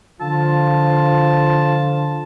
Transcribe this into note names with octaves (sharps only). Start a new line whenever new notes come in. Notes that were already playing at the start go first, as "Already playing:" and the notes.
D3 F3 F4 A5